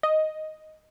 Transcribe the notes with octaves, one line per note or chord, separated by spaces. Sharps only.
D#5